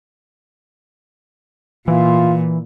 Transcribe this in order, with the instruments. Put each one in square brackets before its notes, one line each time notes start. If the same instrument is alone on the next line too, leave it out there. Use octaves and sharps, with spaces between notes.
[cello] A#2 [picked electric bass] E3 [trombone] F4